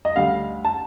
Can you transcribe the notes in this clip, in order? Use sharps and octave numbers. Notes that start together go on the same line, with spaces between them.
D#5
D2 D3 G3 F5
A5